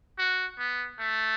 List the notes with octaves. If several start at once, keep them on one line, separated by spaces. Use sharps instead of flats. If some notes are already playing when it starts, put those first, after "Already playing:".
F#4
B3
A3